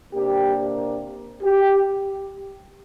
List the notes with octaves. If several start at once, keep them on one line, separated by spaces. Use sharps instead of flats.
C3 A#3 D4 G4
G4